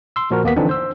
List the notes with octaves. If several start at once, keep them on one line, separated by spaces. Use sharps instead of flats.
C6 E6
A#2 F3 F#4 A#4
D#2 A#3 B3 B6
D3 E3 F3 C4 D4 D#4
C5 E6